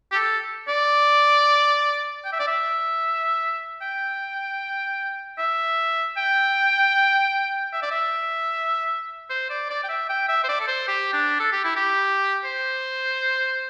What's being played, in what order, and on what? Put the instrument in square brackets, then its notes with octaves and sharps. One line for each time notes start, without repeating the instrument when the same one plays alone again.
[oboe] G4
A4
D5
G5
E5
D5
E5
G5
E5
G5
E5
D5
E5
C5
D5
D5
G5
E5
G5
E5
C5
D5
A4
C5
G4
D4
A4
G4
E4
G4
C5